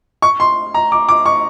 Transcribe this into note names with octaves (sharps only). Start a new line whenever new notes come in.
C#6
C6
A#5
D6
D6
C#6